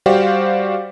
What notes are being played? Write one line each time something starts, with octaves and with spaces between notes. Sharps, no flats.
G3 F#4 G4 C5 D5 F5